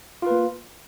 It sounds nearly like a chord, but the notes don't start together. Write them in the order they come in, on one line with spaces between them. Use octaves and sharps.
F4 B4 A#3